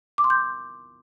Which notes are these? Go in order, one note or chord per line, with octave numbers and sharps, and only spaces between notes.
D6
C6
G6